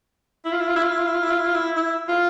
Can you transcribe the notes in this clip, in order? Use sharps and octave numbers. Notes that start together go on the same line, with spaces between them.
E4
F4
E4
F4
E4
F4
E4
F4
E4
F4
E4
F4
E4
F4
E4
E4
F4